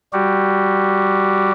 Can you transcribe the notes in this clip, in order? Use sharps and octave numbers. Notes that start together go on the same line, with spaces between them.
G3 F#4 G4